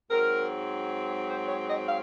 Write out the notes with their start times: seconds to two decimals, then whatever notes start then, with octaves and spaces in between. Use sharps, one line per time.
0.09 G#2 F#3 C4 A#4
1.29 C5
1.48 C#5
1.69 D#5
1.88 F5